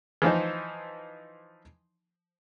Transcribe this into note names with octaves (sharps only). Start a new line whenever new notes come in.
E3 F3 D#4 C5